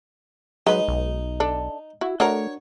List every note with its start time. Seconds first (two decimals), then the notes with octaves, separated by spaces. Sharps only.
0.67 F#3 G#3 D#4 B4
0.88 B1
1.40 D4 A4
2.01 E4 F#4
2.20 A3 D4 F#4 A#4 C#5